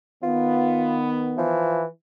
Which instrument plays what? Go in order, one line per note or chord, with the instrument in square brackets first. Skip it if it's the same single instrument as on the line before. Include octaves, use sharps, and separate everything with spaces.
[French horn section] D#3 B3 [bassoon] F4
[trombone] E3 [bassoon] F3